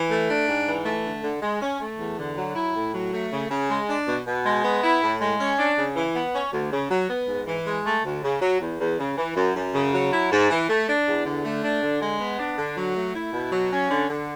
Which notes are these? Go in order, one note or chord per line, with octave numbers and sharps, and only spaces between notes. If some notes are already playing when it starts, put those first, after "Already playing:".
Already playing: E3
A3
D4
G#2
E3
A3
D3
D3
G#3
C#4
A3
E2
D3
F#3
E4
A2
F#3
A3
C#3
C#3
G#3
D4
B2
B2
G#3
B3
E4
A2
G#3
C#4
D4
C#3
E3
B3
C#4
D2
C#3
F#3
B3
G#2
E3
G#3
A3
D2
C#3
F#3
E2
E2
C#3
E3
F#2
F#2
C#3
F#3
E4
G#2
E3
A3
D4
E2
D3
A3
D4
D3
G#3
B3
D4
D3
F#3
A3
E4
B2
F#3
C#4
D3
D3